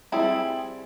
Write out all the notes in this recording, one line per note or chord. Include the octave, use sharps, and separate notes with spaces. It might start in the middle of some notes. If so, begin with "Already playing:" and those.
G3 C4 E4 G#4